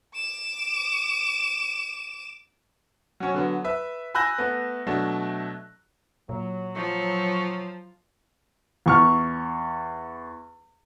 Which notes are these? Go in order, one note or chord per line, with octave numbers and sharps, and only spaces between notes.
D6 E7
F#3 C#4
D3 F#3 B3
B4 E5
G#5 B5 E6 F#6 G6 A#6
A3 B3
B2 F#3 A3 D4
A#2 F#3
F3 C#6
E2 C#6 F6